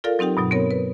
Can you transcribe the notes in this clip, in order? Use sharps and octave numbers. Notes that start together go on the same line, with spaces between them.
F4 A4 A#4 D5 F5
F#3 C4 D#4 G4 G5
G2 B2 F#3
B3 C4 A#4 C#5
B4